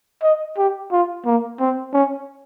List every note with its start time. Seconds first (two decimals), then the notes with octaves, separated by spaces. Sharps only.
0.23 D#5
0.57 G4
0.92 F4
1.26 A#3
1.60 C4
1.93 C#4